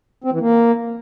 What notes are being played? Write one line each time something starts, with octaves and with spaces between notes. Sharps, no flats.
C4
E3
A#3